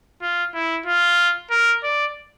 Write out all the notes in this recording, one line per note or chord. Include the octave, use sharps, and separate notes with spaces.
F4
E4
F4
A#4
D5